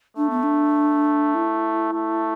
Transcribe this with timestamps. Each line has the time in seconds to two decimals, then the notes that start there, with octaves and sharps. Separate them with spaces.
0.17 A3 D4
0.30 B3
0.43 D4
1.34 E4
1.94 A3